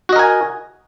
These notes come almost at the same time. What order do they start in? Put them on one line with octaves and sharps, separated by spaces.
F#4 D#5 A#4 G#5